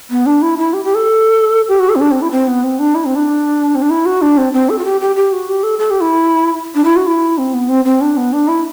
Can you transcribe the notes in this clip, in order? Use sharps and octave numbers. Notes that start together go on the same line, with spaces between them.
B3
D4
E4
E4
G4
G4
A4
G4
F#4
A4
C4
D4
C4
E4
C4
B3
C4
D4
E4
C4
D4
C4
D4
E4
F#4
D4
C4
C4
A4
F#4
G4
G4
G4
F#4
G4
A4
A4
G4
E4
D4
E4
F#4
E4
C4
B3
C4
C4
D4
B3
D4
E4